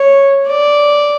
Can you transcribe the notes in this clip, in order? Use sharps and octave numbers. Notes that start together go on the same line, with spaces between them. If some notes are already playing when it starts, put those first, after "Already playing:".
Already playing: C#5
D5